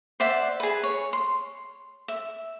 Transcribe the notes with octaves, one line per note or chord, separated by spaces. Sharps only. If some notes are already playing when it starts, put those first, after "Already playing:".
C5 D5 E5 F#5
G#4 B4
C#5
C6
E5